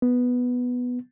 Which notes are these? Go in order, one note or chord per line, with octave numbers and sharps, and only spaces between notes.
B3